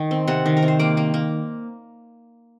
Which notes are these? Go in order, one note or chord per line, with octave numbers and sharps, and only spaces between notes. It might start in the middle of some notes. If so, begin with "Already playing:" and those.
Already playing: D#3
C4
C3 F#5
D#3
A#4
C3
C5
A#3 D5
A#3
A#3